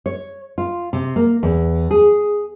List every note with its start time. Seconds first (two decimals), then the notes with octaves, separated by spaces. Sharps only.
0.06 C#5
0.58 F4
0.93 C3
1.16 A#3
1.43 E2
1.91 G#4